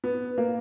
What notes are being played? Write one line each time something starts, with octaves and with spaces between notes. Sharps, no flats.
B3
A#3